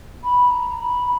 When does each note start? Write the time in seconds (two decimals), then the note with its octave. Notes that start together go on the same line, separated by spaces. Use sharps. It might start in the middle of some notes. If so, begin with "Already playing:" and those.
0.23 B5
0.50 A#5
0.79 B5